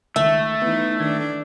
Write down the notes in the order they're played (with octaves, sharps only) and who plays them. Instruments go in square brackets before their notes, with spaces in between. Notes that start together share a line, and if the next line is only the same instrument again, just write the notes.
[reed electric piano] C#2 D#3 [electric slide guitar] A3 [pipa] E5
[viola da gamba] E3 D#4 [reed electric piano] B3
[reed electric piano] D#3 G#6 [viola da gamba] D4